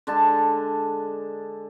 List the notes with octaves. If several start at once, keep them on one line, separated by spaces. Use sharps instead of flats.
D3 G#3 D4 A5